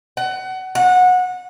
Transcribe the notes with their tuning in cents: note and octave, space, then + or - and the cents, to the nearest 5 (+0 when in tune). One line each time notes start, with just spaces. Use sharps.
F#5 +25
F#5 -20